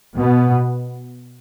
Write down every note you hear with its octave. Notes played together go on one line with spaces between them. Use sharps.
B2 B3